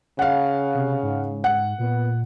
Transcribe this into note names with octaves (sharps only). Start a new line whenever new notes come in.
C#3 F5 F#5
C3
G#2
F#5
A#2 B3